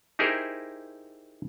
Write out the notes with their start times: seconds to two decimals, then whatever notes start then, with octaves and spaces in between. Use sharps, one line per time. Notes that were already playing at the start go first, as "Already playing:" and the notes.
0.19 D#4 E4 G4 G#4 A#4 C5